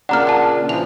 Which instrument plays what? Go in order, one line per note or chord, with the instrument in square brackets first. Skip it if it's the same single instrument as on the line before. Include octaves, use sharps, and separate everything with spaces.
[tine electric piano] A#2 C#3 D4 [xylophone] F#5 A#5 F6
[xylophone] F#5 A5
[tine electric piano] E3 F3 [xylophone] F7